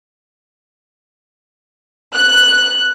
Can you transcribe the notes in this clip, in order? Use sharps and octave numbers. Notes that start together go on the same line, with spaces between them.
F#6